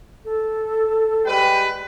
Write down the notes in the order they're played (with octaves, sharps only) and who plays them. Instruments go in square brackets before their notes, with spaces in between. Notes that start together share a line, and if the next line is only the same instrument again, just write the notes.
[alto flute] A4
[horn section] G3 G#3 B4 [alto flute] G5